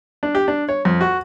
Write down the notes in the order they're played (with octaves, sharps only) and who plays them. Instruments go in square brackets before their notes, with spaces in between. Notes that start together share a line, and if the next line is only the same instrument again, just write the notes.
[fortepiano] D4
G4
D4
C#5
F2
F#4